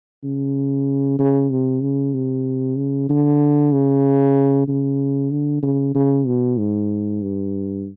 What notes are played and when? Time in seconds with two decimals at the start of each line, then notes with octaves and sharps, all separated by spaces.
0.24 C#3
1.19 C#3
1.50 C3
1.82 C#3
2.14 C3
2.77 C#3
3.09 D3
3.72 C#3
4.68 C#3
5.31 D3
5.63 C#3
5.95 C#3
6.27 B2
6.58 G#2
7.22 G2